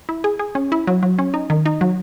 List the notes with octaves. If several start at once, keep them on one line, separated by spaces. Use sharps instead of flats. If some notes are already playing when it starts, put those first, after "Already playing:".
E4
G#4
G#4
C#4
E4
F#3
F#3
C#4
D#4
D#3
D#4
F#3